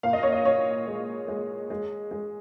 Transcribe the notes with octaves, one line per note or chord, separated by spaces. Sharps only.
A#2 F5
D#5
C#5
D#5
A#2 C#5
G#3
G#3
G#3
G#3